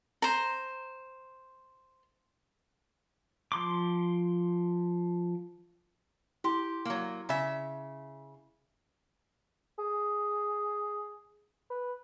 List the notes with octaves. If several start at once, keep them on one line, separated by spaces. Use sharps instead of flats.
C5 A#5
F3 C6 D6
E4 G4 C6
F#3 A#3
C#3 E5
G#4
B4